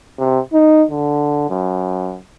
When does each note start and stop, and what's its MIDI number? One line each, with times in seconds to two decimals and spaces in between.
0.19 0.39 48
0.53 0.84 63
0.91 1.48 50
1.50 2.19 42